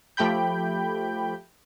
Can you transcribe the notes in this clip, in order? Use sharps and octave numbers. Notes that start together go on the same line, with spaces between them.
F3 A3 G4 G5 B5 G6